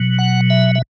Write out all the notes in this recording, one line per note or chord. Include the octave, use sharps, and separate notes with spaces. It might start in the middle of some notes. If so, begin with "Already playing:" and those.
Already playing: B2 F#3
F#5
E5
E5